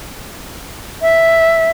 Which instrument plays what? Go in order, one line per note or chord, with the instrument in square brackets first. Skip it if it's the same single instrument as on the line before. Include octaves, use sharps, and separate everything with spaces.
[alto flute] E5